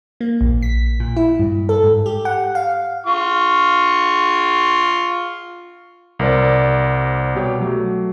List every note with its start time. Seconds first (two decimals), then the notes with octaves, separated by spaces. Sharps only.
0.21 A#3
0.41 A#1
0.62 B6
1.00 A#2
1.16 E4
1.39 G2
1.69 A4
1.83 G#2
2.06 G4
2.25 F#5
2.55 F5
3.06 F4 C#6
6.19 C2 A#4 C5 D5
7.35 B2 G4 C#5
7.60 F#3 A3